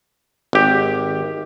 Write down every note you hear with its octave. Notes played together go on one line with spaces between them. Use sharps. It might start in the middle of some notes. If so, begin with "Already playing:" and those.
G#1 G4